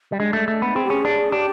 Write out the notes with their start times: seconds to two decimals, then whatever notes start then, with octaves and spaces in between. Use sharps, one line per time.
0.12 G3
0.19 G#3 D4
0.33 A3
0.48 A3
0.62 B3
0.75 C4 G#4
0.85 G4
0.90 C#4 G#4
1.05 D4
1.32 D4 G4